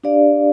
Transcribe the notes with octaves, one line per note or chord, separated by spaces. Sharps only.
D4 G4 D5 F5